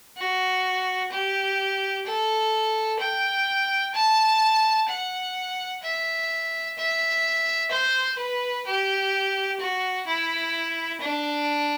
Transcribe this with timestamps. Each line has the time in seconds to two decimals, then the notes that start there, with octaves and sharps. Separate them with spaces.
0.17 F#4
1.12 G4
2.06 A4
2.99 G5
3.94 A5
4.88 F#5
5.82 E5
6.77 E5
7.71 C5
8.18 B4
8.66 G4
9.60 F#4
10.07 E4
11.01 D4